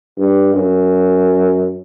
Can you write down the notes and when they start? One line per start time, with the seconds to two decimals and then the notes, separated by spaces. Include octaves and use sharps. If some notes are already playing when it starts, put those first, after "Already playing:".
0.18 G2
0.54 F#2